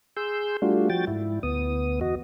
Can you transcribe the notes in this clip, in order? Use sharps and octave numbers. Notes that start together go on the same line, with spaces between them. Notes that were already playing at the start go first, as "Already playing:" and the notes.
G#4 C6 E6 G6
G3 A3 D4 F4 F#4
F3 F#4 G5 A6
G#2 E4
D2 B3 D#6
E2 F#4 D#5